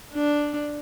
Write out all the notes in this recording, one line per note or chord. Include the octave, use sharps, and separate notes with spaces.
D4